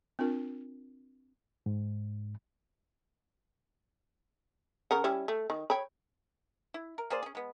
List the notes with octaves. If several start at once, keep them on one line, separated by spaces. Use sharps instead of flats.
C4 D4 F4 A#4
G#2
C#3 A#4 F#5
G3 C#4 E4
A3
D#3
C#5 G5 B5
E4
A#4
A#3 G#4 C5 D5
C#4 G#4
G#3 B3